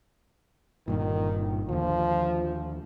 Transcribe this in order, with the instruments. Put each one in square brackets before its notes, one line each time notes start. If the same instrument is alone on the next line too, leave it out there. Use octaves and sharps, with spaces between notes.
[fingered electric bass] G1 G2 A#2 [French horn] D#3
[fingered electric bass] D#2 D3 [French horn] F3